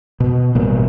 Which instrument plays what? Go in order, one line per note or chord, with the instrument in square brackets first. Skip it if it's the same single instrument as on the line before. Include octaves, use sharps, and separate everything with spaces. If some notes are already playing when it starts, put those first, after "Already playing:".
[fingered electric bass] B2
A1 G2 B2 A#3